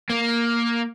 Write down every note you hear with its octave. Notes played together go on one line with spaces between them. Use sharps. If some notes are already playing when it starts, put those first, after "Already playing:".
A#3